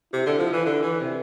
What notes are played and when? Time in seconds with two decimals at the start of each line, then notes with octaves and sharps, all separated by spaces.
0.13 C3 E4
0.26 D3
0.39 F3
0.52 E3
0.66 D3
0.82 E3
1.00 C3